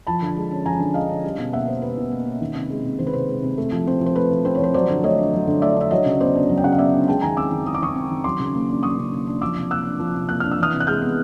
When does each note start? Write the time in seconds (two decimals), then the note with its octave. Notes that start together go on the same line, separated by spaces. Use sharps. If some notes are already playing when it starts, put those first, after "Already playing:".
0.07 F3 A5 B5
0.22 D3
0.36 G#3
0.51 C#4
0.66 F3 G#5 A#5
0.80 D3
0.94 G#3 D#5 F5
1.09 C#4
1.24 G3
1.38 B2
1.53 A#3 E5 F#5
1.67 C#4 C5
1.82 G3 B4
1.97 B2
2.11 A#3
2.26 C#4
2.41 D#3
2.55 C3
2.70 G#3
2.85 C3
2.99 D#3 C5
3.07 B4
3.13 C3 C5
3.29 G#3
3.43 C3
3.58 A3
3.72 F3
3.87 C4 C5
4.01 F3
4.06 C5
4.15 A3 B4
4.31 F3
4.45 C4 C5
4.55 C#5
4.59 F3 C5
4.74 F#3 C5 D5
4.89 D3
5.03 A3 C#5 D#5
5.18 D4
5.33 F#3
5.47 D3
5.62 A3 D5 E5
5.76 D4 E5
5.91 F#3 C#5 D#5
6.06 C#3
6.20 B3 C5 D5
6.35 D4
6.49 F#3
6.58 G5
6.64 C#3 F#5
6.72 F5
6.78 B3 D5 E5
6.94 D4
7.08 G#3 G5 A5
7.22 D#3 G#5 A#5
7.37 C4 D6 E6
7.52 D#3
7.66 G#3 D#6
7.75 D6
7.81 D#3 C#6 D#6
7.95 C4
8.10 D#3
8.24 F#3 C6 D6
8.39 C#3
8.54 A#3
8.69 D4
8.83 F#3 C#6 D#6
8.98 C#3
9.13 A#3
9.27 D4
9.41 F3 D6 E6
9.56 C3
9.71 A#3 E6 F#6
9.86 D4
9.99 F3
10.14 C3
10.29 A#3 F#6
10.40 D4 F6
10.52 E6
10.58 E3 D#6 F6
10.73 C3
10.80 F#6
10.87 G#3 F6 G6
11.02 B3